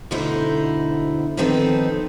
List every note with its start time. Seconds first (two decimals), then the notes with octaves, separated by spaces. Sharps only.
0.11 D2 B2 D3 D#4 E4 C5
1.37 D#3 F3 B3 C4 D#4 A4